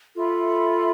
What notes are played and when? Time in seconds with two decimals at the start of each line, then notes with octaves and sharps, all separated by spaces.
0.16 F4 A4 E5 B5